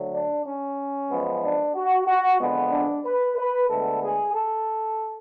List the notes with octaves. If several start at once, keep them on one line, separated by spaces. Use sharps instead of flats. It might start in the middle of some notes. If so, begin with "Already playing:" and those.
Already playing: D2 D3 F#3
D4
C#4
F#2 F3 G#3 B3
D4
F#4
F#4
F2 D3 G#3 B3
D4
B4
B4
D2 D3 G#3 B3 A4
G#4
A4